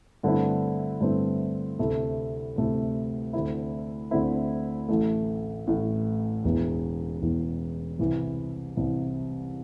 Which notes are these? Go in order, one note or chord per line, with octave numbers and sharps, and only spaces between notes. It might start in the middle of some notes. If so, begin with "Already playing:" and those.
G2 D3 A3 C4 E4
G2 D3 A3 C4 E4
D2 C3 A3 E4
D2 C3 A3 E4
D2 D3 A3 C4 E4
D2 D3 A3 C4 E4
A1 A2 A3
A1 A2 A3
E1 E2 E3
E1 E2 E3
C2 C3 E3
C2 C3 E3